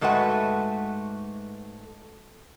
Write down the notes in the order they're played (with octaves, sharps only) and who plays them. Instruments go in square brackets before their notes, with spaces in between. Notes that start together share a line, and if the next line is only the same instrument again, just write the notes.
[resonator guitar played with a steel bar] G#2 G#3 A3 F#4 B4 F#5